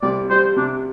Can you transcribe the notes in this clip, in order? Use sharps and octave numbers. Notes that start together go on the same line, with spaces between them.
C2 D5
G3 C5
C3 D4